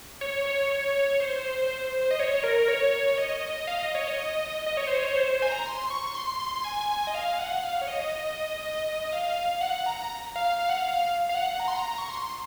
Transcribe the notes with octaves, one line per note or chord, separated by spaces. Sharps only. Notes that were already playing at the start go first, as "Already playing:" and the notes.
C#5
C#5
C#5
C5
D#5
C#5
A#4
C#5
D#5
F5
D#5
C#5
D#5
D#5
C#5
C5
C#5
C5
C5
G#5
A#5
C6
C#6
C6
C6
G#5
G#5
G#5
D#5
F5
F#5
F5
C#5
D#5
F5
F#5
A#5
F5
F5
F#5
F5
F5
F#5
A#5
C6
A#5
C#6
C6